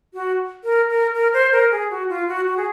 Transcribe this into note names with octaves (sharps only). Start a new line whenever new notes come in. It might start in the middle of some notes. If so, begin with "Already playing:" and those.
F#4
A#4
A#4
A#4
C5
A#4
G#4
F#4
F4
F#4
F#4
G#4